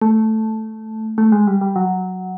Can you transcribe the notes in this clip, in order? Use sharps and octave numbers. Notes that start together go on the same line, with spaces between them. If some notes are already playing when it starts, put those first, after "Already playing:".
A3
A3
G#3
G3
G3
F#3